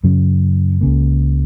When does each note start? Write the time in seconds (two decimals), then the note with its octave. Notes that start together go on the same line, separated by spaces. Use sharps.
0.04 F#2 C#3 F#3 C#4
0.81 C#2 C#3 A#3